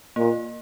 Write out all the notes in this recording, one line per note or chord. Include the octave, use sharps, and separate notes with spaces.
A#2 A#3